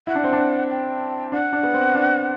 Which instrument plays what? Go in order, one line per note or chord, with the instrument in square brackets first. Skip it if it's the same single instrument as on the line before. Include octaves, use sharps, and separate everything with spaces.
[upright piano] E4 [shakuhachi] F#5
[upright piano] D4
C4
D4
[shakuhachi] G5
[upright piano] D4 [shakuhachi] F#5
[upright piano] D4
B3
C4
D4